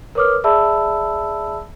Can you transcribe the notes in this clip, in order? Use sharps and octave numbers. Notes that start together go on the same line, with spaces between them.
A#4 B4 C#5 D6 D#6 F6
G#4 D5 E5 A5 B5 E6